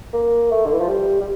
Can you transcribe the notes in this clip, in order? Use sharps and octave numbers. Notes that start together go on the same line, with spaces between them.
A#3
A3
D3
E3
F3
G3
G3